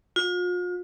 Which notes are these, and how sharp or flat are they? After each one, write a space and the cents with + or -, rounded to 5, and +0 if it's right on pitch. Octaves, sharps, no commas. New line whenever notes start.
F4 +40